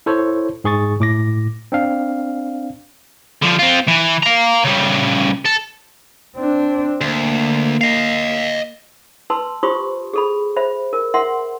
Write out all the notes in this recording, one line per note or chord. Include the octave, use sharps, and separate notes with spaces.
E4 A4 C5 C#5
G#2 G#4 C#6 A6
A2 D6 A#6
C4 D4 F5
D3 F3
C4 F4
E3
F5 A#5
C#3 G3
A4
C4 D4
D2 A#3
D#5 F5
B4 A5 C6 E6
F4 G4 C5 C6 C#6 D#6
G#4 A4 B5
C5 E5 B5
A#4
A#4 E5 F#5 C6